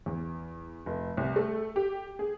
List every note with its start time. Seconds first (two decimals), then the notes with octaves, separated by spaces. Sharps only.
0.06 E2
0.86 F1
1.17 C2
1.36 A3
1.76 G4
2.19 G#4